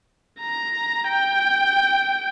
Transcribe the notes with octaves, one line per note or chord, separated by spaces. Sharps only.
A#5
G5